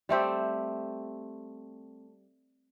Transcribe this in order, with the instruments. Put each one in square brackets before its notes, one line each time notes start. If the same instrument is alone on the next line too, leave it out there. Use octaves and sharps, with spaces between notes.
[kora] G3 A3 C4 G4